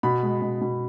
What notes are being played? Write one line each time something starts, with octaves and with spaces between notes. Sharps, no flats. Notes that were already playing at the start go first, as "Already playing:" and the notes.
B2 B5
G#3
B2
B2